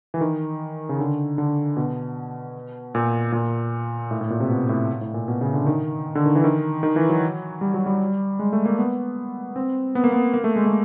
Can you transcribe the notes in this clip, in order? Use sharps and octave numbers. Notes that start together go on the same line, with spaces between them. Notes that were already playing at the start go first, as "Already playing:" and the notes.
E3
D#3
C#3
D3
D3
B2
A#2
A#2
A2
A2
A#2
C3
B2
A2
A2
A#2
B2
C#3
D3
D#3
D3
D#3
E3
D#3
D#3
E3
F#3
G3
F#3
G3
G#3
A3
A#3
B3
C4
B3
A#3
B3
A#3
A3
G#3
A3